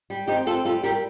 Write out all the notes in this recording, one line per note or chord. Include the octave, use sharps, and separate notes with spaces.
G3
C4 D#4 G4
C4 F4 A4
G3 F4 A4
G3 G4 A#4